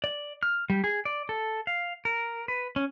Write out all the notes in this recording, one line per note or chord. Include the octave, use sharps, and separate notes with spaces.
D5
F6
G3
G#4
D5
A4
F5
A#4
B4
C#4